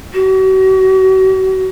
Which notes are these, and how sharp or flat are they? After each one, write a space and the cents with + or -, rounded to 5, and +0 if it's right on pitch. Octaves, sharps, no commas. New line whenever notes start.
F#4 +40